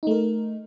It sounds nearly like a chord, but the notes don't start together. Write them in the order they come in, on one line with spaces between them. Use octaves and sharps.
D#4 A3 A#4